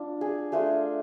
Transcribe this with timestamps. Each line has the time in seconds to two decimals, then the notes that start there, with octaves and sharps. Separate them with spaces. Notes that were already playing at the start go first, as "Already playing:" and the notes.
Already playing: D4 F4
0.21 G#4
0.52 A3 D4 F4 G#4